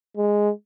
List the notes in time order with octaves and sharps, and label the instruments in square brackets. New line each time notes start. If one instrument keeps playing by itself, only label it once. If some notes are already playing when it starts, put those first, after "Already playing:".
[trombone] G#3